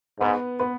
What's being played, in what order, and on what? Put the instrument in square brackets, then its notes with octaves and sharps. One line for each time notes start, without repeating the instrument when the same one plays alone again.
[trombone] G#2 [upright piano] B3 B4
[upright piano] B3 B4